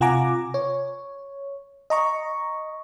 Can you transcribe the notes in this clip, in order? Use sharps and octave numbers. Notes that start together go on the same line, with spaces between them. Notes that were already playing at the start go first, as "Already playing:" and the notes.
C3 F4 F#5 G#5 A#5 D6
C#5
D#5 A#5 C#6